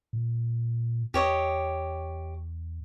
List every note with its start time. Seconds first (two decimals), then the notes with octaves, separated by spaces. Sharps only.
0.13 A#2
1.14 E2 G4 C#5 D#5